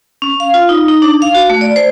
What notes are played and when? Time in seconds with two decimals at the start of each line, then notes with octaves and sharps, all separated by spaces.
0.22 C#4
0.40 F5
0.54 F4
0.69 D#4
0.88 D#4
1.02 D4
1.22 F5
1.35 F#4
1.50 A3
1.61 D5
1.76 C5